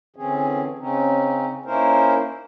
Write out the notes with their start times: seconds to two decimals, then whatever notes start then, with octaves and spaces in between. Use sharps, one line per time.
0.16 D3 E3 C4 C#4 G#4
0.79 C#3 C4 C#4 D#4
1.65 A#3 C#4 D#4 E4 A#4 C5